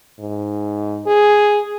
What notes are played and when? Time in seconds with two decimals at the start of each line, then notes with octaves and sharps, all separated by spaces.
0.20 G#2
1.07 G#4